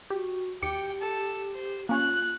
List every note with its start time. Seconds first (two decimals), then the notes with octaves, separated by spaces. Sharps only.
0.10 F#4 G4
0.62 D#2 G4 G5 D6 C#7
1.02 A4
1.55 C5
1.89 A#3 C#4 F4 C#5 F#6